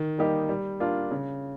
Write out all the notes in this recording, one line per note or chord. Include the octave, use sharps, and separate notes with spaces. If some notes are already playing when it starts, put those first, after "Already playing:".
Already playing: D#3
G3 A#3 D#4 G4
G3
A#3 D4 F4
C#3